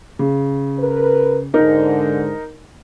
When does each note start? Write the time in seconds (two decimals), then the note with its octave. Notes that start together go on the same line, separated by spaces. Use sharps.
0.19 C#3
0.78 A#4 B4
1.54 G#2 D3 D#4 A#4